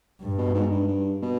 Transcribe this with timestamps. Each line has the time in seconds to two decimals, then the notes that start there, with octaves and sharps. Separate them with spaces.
0.21 G2
0.38 B2
0.54 G#2
0.72 G2
0.88 G2
1.22 B2